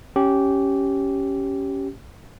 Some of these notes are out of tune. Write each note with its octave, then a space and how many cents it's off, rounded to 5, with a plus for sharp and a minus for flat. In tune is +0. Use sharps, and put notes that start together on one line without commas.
C#4 +0 G4 -15